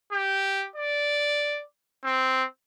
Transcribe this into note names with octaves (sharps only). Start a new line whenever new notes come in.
G4
D5
C4